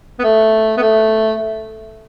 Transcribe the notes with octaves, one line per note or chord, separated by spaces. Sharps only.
B3
A3
B3
A3